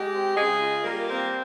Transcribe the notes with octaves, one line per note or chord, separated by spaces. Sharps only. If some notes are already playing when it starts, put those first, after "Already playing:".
Already playing: G#3 G4
C4
C#3 G#3 G#4
F4
G3 A#3 A#4
A#3 C4 A#4